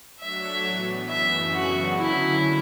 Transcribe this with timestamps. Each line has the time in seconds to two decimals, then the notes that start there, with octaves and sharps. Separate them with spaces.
0.20 F#3 A3 D4 F#4 C#5 E5
0.65 A2 E3 B3
1.09 F#2 C#3 E3 A3 E5
1.54 F#2 C#3 F#3 B3 D4 F#4
1.98 D3 F#3 C#4 E4